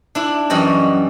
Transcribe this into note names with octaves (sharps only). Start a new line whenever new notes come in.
D4 E4
F#2 E3 G3 C#4 D#5